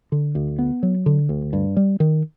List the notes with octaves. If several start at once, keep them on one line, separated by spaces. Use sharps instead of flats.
D3
D2
B3
F#3
D3
D2
G2
G3
D#3